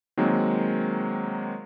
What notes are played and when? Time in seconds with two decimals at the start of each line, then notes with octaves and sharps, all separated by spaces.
0.17 D#3 F#3 G#3 A#3 C4